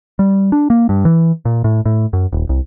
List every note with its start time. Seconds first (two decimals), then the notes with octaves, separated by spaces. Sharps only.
0.19 G3
0.52 D4
0.70 A#3
0.89 G2
1.05 E3
1.45 A#2
1.64 A2
1.86 A2
2.13 F#2
2.33 D#1
2.49 C2